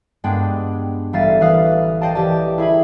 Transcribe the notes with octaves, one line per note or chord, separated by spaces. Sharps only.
G2 G#3 B3 D4 G5
A1 G3 E5 F5 A6 D#7
E3 B4 F5 D#6
C5 D5 D#5 F5 G5 A5
E3 G4 G5 A5
E4 G#4 E5 B5